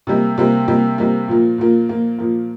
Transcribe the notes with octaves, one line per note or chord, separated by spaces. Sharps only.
C3 G3 A#3
C3 G3 A#3
C3 G3 A#3
C3 G3 A#3
A#2 F3 A#3
A#2 F3 A#3
A#2 F3 A#3
A#2 F3 A#3